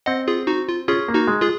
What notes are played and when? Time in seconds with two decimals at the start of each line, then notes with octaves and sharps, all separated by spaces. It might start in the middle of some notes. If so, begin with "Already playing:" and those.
0.06 C4 D#5 F#5
0.28 F4 G#4
0.47 D#4 F#4
0.68 F4
0.87 C#4 F4 G#4
1.08 A#3
1.14 D#4 F#4
1.28 G#3
1.41 F4 G#4